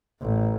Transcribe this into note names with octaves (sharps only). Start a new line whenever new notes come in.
A1